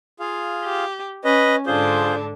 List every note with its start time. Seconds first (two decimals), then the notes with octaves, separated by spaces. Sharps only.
0.20 F4 G#4 F5
0.64 G4
1.24 C#4 B4 D#5
1.66 G#2 D3 D4 F4 G#4 C5